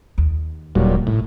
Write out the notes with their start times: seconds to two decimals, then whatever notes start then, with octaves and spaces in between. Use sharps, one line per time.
0.18 D#2
0.75 D#1 A#1 A#2 F#3 G3
1.07 G#1 A2